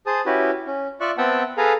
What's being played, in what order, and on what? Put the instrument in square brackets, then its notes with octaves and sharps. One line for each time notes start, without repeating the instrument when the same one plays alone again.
[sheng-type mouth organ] G#4 C5 A5 D#6
C#4 E4 F#4 G4 B4
C#4
F4 D5 E5 C#6 F#6
B3 C4 E5 F#5 G5 A5
G#4 A4 B4 F5 G#5 A#5